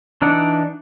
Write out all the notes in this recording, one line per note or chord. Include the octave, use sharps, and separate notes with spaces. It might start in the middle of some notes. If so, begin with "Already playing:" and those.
E3 D4 D#4 D5 F#5